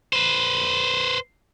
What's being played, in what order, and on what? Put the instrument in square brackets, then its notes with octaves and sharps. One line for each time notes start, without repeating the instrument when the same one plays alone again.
[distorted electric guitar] B4 C5